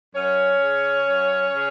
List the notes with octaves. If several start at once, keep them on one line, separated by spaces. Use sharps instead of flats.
F#2 C#4 C#5
C#3
F#2
C#3